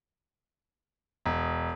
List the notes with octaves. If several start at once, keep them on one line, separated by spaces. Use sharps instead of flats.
E1